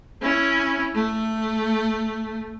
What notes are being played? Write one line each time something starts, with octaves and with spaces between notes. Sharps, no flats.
C#4 E4
A3